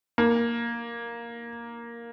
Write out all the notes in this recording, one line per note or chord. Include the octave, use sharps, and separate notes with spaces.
A#3